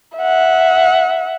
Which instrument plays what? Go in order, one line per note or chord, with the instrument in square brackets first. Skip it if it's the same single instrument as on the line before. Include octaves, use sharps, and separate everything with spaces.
[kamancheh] E5 F#5